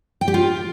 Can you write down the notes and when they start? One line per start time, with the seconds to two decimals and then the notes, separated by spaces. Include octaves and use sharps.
0.21 G5
0.28 G4
0.34 F4